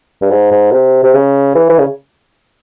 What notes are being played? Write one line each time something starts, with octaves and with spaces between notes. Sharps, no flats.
G2
G#2
G#2
C3
C3
C#3
E3
E3
C#3